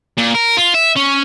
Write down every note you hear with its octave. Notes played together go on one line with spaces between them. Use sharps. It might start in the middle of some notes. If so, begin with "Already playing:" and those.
A#2
A#4
F4
E5
C#4